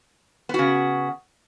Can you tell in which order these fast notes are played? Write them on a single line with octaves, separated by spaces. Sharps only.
B3 F#4 C#3